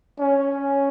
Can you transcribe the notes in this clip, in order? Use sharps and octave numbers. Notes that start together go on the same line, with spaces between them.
C#4